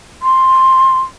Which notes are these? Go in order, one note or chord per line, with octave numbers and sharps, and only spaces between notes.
C6